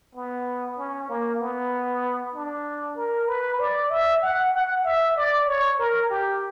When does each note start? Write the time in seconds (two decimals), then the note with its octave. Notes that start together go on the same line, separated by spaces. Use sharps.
0.15 B3
0.78 C#4
1.09 A#3
1.40 B3
2.34 D4
2.97 A#4
3.28 B4
3.60 D5
3.91 E5
4.22 F#5
4.54 F#5
4.85 E5
5.16 D5
5.47 C#5
5.79 A#4
6.10 G4